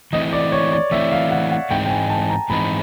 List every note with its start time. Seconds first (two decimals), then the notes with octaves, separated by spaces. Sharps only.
0.13 E3 A3 C4 E4 D#5
0.33 D5
0.52 C#5
0.72 D5
0.91 E3 A3 C4 E4 E5
1.12 F5
1.31 F#5
1.52 F#5
1.70 G#2 E3 G#3 C4 D#4 G5
1.86 G5
1.90 G#5
2.10 A5
2.30 A#5
2.50 G#2 E3 G#3 C4 D#4 B5